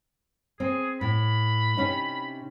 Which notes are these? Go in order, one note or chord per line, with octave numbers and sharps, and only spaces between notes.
C4 G#4
A2 B5
C3 C#4 D#4